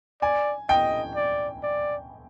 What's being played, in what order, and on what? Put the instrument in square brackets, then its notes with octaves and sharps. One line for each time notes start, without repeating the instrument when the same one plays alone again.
[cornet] D5 [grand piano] G#5
[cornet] D#5 [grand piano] G5
[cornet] D5
D5